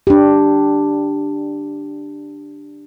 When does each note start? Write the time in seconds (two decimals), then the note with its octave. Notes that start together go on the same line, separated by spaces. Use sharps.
0.07 D4 G4